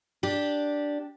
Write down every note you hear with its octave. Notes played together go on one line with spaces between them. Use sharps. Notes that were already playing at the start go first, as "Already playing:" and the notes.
D4 G4